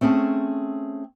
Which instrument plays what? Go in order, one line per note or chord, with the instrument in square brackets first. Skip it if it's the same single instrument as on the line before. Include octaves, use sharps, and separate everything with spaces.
[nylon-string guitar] A3 C4 C#4 G#4 A5